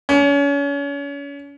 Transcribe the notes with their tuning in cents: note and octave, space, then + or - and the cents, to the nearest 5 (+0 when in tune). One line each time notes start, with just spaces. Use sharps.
C#4 +35